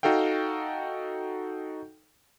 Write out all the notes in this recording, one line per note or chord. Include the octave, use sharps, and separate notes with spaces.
D#4 F#4 A4 F5 G5